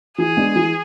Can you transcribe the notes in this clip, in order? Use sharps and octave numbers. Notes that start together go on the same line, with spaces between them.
E3 G#4
G#3 B3 D4
E3